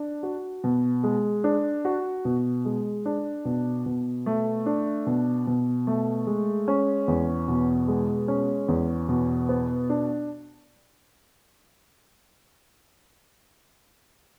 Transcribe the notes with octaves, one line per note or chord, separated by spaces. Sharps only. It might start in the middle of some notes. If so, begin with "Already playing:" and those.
Already playing: D4
F#4
B2
G#3
D4
F#4
B2
G#3
D4
B2
B2
A3
D4
B2
B2
A3
G#3
C#4
E2
B2
G#3
C#4
E2
B2
B3
D4